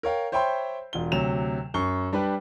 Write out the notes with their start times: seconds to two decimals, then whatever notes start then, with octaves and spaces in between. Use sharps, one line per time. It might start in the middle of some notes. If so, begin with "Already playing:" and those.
0.03 A#4 C#5 F5 G5
0.32 C5 C#5 E5 G5 B5 C6
0.93 E1 F4 G7
1.12 D2 C3 F#3 E7 F7
1.74 F#2 C#6 G7
2.13 G3 D4 G4 B4